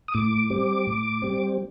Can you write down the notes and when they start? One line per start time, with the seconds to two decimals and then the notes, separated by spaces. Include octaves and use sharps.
0.08 D#6
0.14 A2 D6
0.50 G3 C4
0.87 A2
1.22 G3 C4